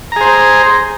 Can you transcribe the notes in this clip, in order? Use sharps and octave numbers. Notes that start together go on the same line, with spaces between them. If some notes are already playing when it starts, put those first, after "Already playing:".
G#4 C5 A#5